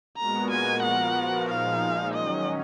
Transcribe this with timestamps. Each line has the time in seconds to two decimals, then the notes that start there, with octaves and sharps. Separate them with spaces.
0.18 A#2 G#3 B3 F#4 A#4 A#5
0.51 G#5
0.83 F3 B3 F#4 A#4 F#5
1.48 A#2 F3 G#3 D#4 F5
2.14 D#3 F#3 C#4 D#5